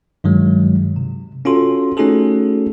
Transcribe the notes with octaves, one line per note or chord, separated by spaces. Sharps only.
G2 D#3 F#3 G#3
C3
C#4 F4 F#4 A4 C6
A3 C#4 D#4 F#4 G#4 A4